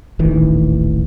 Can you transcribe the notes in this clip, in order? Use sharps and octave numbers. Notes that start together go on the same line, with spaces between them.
D#1 A1 D#3 E3